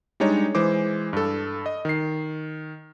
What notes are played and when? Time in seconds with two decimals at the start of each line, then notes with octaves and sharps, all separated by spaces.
0.20 G3 G#3 D4 D#4 C#5
0.55 E3 G#3 C5 D6
1.13 G2 A4
1.66 D#5
1.85 D#3 C7